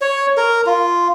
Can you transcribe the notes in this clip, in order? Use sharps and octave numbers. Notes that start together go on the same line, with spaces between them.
C#5
A#4
F4